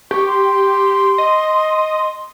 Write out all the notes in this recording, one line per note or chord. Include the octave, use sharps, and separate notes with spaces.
G4 C#6
C6
D#5